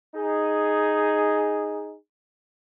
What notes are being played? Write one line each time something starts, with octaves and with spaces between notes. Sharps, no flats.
D#4 G#4